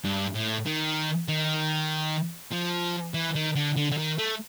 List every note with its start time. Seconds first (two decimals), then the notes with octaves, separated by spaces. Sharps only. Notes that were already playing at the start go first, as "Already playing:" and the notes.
0.05 G2
0.35 A2
0.66 D#3
1.28 D#3
2.52 F3
3.14 E3
3.35 D#3
3.56 D3
3.76 D3
3.91 D3
3.98 D#3
4.18 A3